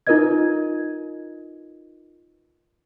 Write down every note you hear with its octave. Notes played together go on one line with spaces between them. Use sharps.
D#4 F4 A#4 B4 D#5 G#6